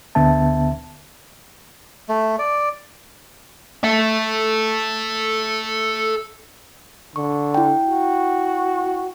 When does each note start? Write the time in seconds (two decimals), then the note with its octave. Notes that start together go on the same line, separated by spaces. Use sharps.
0.15 D2 D3 B3 E5 A5
2.09 A3
2.39 D5
3.84 A4 E5
7.16 D3 C#6
7.54 E4 G5
7.86 F#4